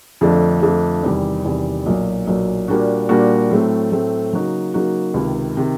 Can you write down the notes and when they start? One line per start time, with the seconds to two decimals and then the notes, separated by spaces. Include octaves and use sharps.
0.21 F2 D3 F3 A3 D4
0.62 F2 D3 F3 A3 D4
1.03 E2 C3 D#3 G3
1.45 E2 C3 D#3 G3
1.86 B1 A#2 F#3
2.27 B1 A#2 F#3
2.68 A#2 G3 A#3 D4 F#4
3.09 A#2 G3 A#3 D4 F#4
3.51 A2 F#3 A3 C4
3.92 A2 F#3 A3 C4
4.33 C#3 F#3 A#3 D#4 F#4
4.74 C#3 F#3 A#3 D#4 F#4
5.14 C#2 C3 D#3
5.57 C3 D#3